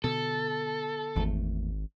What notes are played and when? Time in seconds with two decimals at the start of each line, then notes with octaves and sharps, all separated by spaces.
0.04 B2 D3 A4
1.16 G#1 E2 A3